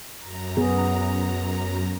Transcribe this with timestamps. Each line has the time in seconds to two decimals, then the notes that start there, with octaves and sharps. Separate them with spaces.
0.19 F#2 A#5
0.57 B3 G#4